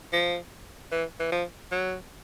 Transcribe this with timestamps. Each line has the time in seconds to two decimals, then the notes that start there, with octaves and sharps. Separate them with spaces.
0.13 F3
0.92 E3
1.20 E3
1.32 F3
1.71 F#3